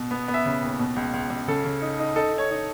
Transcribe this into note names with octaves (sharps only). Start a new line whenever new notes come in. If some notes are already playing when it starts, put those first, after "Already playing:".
Already playing: B2
B3
B3
E5
C#3
D#2
B2
C#2
C#2
C#2
C#3 A4
C#3
D#4
D#4
D#4 A4
D#4 C#5
D#4